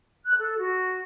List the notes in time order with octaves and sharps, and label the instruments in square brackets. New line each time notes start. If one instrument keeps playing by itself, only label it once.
[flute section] F#6
A4
F#4